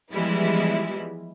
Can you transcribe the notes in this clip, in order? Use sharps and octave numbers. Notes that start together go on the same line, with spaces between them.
E3 F3 G3 G#3 B3 E4